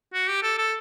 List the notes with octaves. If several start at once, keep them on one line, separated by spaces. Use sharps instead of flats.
F#4
G4
A4
A4